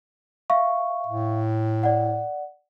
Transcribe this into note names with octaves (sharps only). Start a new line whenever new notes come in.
E5 F5 C#6
A2
D5 F#5